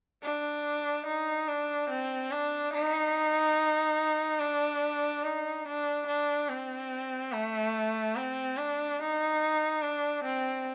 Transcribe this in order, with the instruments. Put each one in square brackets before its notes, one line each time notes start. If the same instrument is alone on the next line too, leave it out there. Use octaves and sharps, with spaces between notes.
[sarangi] D4
D#4
D4
C4
D4
D#4
D4
D#4
D4
D4
C4
A3
C4
D4
D#4
D4
C4